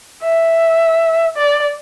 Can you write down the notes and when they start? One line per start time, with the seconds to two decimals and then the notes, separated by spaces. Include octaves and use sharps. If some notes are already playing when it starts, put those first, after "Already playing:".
0.23 E5
1.37 D5